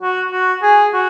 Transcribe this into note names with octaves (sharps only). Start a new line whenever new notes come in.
F#4
F#4
G#4
F#4